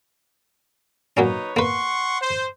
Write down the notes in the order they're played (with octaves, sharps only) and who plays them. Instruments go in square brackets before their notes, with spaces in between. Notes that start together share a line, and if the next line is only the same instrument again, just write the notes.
[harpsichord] F#3 A#3 C#4 [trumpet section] D#4 B4 C#5
[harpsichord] A#3 B4 [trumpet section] F#5 C6 C#6
[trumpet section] C5